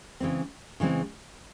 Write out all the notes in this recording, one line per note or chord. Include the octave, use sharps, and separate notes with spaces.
C#3 E3 G#3 C4
C#3 E3 G#3 C4